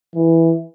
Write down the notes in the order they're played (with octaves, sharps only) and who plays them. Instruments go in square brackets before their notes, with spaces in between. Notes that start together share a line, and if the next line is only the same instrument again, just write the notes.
[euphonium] E3